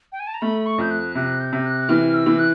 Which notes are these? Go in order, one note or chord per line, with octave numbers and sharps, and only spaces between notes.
G5
G#5
A5
A#5
A3 B5
C#6
F2 G6
F#6
C3 F#6
G6
C3
F#6
E3 F6
E6
E3
F#6